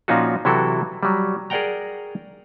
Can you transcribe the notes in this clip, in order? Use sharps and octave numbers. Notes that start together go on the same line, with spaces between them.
A#2 F3 C#4 D#4 F4 F#4
C3 E3 F#3 E4 F#4 A4
F#3 G3
G#4 A#4 D5 F#5 G5 A#5